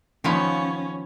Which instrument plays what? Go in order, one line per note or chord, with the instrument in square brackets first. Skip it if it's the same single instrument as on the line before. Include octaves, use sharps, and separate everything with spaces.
[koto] D#3 F3 B3 [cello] C#4